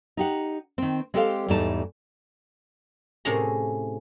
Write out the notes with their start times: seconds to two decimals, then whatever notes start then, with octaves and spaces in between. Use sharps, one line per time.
0.17 D#4 G4 F#5
0.78 D#3 C4
1.14 G#3 C4 G4 A4 C5 F5
1.48 E2 G#2 G3 A3 D#4 A5
3.25 A2 C3 C#4 E4 G#4 A#5